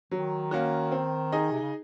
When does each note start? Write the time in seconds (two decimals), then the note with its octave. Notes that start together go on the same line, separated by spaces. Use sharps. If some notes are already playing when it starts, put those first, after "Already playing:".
0.11 D#3 F#3
0.51 A#3 C#4 F#4
0.92 C4
1.32 D#4 G#4 D#5
1.52 C3
1.61 C#3